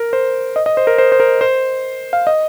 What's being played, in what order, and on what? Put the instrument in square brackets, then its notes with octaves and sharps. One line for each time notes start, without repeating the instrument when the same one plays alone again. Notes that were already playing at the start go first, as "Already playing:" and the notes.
Already playing: [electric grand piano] A#4
C5
D#5
D#5
C5
A#4
C5
C5
A#4
C5
F5
D#5